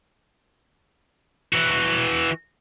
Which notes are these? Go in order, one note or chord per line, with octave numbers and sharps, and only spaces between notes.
E3 F#4